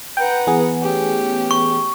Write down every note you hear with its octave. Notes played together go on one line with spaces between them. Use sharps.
B4 F#5 G5 A#5
E3 B3 G#4
A3 C#4 G4
C#6